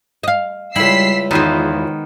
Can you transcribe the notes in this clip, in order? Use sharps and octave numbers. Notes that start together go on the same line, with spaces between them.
D#5 F5
C#2 G3 E4 B5 E6 B6 C7
E2 D#3 E3 G#3 B3 F4 C5